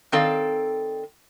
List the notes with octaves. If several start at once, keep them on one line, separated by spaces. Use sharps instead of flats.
D#3 C4 A4 D5 F5